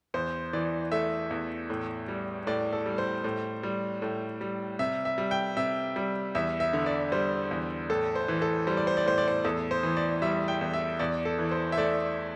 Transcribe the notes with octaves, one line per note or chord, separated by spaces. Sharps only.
E2 C5
E3 D5
A3 E5
E2
A2
G3
A2 D5
A4
G3
C5
A2
G3
A2
G3
C3 E5
E5
G3
G5
C3 E5
G3
E2 E5
E5
D3
D5
G3 C5
E2
A2 A4
C5
E3
A4
G3 C5
D5
C5
D5
A2 C5
D5
C5
E2 A4
C5
E3
D5
G3 E5
G5
E2
E5
E2 D5
A4
E3
C5
E5
A3 D5